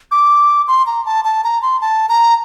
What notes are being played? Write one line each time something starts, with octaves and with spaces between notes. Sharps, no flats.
D6
C6
A#5
A5
A5
A#5
C6
A5
A#5